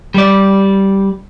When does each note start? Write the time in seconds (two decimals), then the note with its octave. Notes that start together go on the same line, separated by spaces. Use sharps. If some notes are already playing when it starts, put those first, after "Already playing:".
0.14 G3 D5